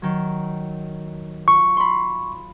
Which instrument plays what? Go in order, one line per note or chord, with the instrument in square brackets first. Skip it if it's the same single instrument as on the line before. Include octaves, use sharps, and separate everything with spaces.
[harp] D#3 F#3
[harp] F4 [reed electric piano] C#6
[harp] B5 C6